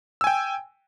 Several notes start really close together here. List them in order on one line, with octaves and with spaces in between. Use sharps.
E6 G#5 G5